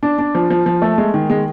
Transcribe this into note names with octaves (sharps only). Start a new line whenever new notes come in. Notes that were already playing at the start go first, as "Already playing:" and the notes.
D4
D4
F3
F3
F3
A3
G#3
D#3
G#3